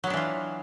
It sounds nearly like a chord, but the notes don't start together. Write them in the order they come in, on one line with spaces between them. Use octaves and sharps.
F#3 B3 D4 E3 F4